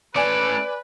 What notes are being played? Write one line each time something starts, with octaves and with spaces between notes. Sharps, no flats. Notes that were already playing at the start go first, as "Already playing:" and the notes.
A3 C#4 B4 D5 G#5 D7